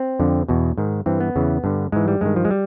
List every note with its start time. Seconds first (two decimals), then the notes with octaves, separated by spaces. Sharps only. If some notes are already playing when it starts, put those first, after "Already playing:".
Already playing: C4
0.20 F2 D3
0.48 E2 B2
0.78 G#2 D#3
1.06 G2 E3 C4
1.20 B3
1.35 E2 C#3 E3
1.64 G2 D3
1.92 G#2 E3 G#3
2.08 G3
2.21 G2 D#3 G#3
2.36 F3
2.45 G#3
2.51 G3